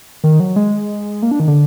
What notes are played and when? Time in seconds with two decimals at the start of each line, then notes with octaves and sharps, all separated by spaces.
0.24 D#3
0.40 F#3
0.56 G#3
1.22 A#3
1.31 D4
1.40 D#3
1.48 D3